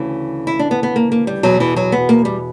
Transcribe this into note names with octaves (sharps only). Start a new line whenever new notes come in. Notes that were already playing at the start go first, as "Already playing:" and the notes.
Already playing: D2 C#3 E3
E4
D4
B3
B3
A#3
A#3
G3
E2 B2 F#3
E3
F#3
B3
A#3
G3